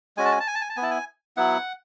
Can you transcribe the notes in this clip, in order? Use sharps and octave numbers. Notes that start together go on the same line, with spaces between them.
G#3 C#4 F#4 G#5
A5
G#5
A5
G#5
A5
G#5
A5
B3 G#5
E4 A5
G#5
F#3 B3 E4 F#5